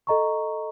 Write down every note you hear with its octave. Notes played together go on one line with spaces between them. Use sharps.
A4 D#5 A#5 C#6